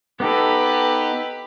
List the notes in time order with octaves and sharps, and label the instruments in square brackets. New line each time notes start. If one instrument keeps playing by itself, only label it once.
[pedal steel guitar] B3 D#4 A4 [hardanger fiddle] G4 B4